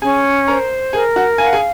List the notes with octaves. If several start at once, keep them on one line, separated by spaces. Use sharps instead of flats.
C#4 G#4 G#5
A#4 C5 A#5
G#4 A#4 G#5
F#4 F#5
F5 G#5
F#5
G#4 G#5